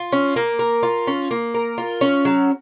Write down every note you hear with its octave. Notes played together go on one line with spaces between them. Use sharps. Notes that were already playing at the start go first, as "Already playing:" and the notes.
Already playing: F4
C#4
A#3
A#4
F4
C#4
A#3
A#4
F4
C#4
F#3